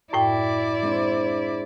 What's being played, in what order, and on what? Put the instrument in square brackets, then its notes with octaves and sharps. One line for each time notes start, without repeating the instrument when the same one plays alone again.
[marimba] F#2 A2 G5 [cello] E4 D5
[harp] G#3 C4 D4